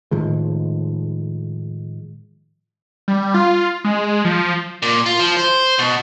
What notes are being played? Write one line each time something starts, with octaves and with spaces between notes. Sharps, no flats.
A2 D#3 F3 G#3
G3
F4
G#3
F3
A#2
F4
F3
C5
B2